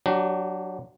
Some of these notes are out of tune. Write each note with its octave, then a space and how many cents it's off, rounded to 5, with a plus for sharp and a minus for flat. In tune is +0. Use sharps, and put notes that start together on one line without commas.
F#3 +0 D4 +0 G4 -35